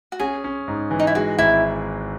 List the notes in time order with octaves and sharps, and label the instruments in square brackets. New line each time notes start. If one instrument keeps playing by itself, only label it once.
[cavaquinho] F#4
[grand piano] C#4 [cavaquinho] G#4
[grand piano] C#4
G#2
E3
[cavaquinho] D#4
E4
[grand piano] G#3 [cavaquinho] F#4
[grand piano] G#1 [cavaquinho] E4